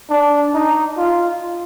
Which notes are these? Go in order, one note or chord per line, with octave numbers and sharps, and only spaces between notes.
D4
D#4
F4